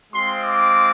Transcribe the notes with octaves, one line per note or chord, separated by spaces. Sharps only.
G#3 C4 F4 C6
D6